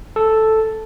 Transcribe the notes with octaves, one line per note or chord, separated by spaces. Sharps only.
A4